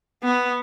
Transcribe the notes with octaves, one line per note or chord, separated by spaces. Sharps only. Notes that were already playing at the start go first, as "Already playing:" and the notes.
B3